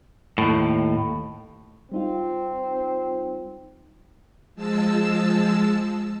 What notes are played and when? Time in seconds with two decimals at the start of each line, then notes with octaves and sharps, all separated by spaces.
0.38 D#2 A2
1.92 G3 C4 D#4 F4
4.55 F3 G#3 A5 E6